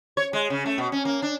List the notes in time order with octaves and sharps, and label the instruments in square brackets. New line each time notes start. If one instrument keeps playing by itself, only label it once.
[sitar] C#5
G#3
C#3
A3
B2
C#4
A#3
D4